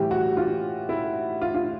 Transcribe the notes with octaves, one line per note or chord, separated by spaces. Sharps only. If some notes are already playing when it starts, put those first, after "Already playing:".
Already playing: A2 E3 G3 G4
F#4
F4
E4
F4
F4